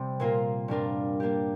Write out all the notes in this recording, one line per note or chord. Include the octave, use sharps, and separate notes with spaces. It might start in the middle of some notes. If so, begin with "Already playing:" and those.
Already playing: C3 G3 C4 G4
A#2 A#3 F4 A#4
G2 G3 D4 F4 A#4
G3 A#3 D4 G4